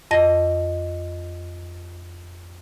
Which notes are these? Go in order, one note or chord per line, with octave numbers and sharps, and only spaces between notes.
F2 D#5 A#6